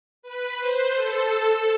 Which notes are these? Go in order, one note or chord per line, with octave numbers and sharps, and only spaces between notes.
B4
C5
A4